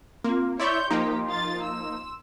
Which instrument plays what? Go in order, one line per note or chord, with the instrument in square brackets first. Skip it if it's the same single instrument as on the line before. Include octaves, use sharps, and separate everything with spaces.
[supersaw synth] A#3 [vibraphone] C4 F4
[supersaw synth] E4 D5 E5 [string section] C#5 G6 [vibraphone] C6
[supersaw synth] F3 A#3 D#4 [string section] G4
[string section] F4 A6
E6